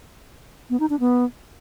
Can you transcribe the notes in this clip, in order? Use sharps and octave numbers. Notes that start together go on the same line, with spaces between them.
B3
D#4
D4
B3